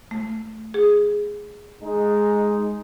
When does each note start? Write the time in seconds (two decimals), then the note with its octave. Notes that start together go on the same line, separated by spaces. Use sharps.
0.11 A3
0.74 G#4
1.82 G#3 D#4